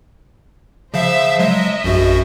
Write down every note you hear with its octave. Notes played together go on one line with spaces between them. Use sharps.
C#3 F3 C5 E5 F5
F#3 G#3 D#5 E5
A#1 F#2 F#4